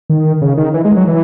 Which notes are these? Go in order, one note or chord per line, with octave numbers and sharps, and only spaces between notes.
D#3
C#3
D#3
E3
G#3
F#3
E3